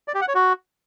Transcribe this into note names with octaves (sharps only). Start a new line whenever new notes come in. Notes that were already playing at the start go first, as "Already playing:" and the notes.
D5
G4
F#5
C#5
F#4